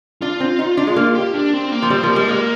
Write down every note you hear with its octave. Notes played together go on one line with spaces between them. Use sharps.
D4 F4
C4
D#4
D4
G#3
A#3
G4
D4
C4
A#3
F3
G3 C4
F3 A#3
G3 G#3
G#3 A#3